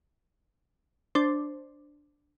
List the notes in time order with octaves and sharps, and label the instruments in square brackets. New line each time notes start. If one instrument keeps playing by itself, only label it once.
[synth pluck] D4 C5